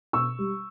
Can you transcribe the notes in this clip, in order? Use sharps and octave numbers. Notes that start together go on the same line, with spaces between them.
B2 C#6 E6
G3